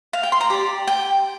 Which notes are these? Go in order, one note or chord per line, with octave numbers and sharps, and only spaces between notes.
F5
G5
C6
A#5
G4 D5
G5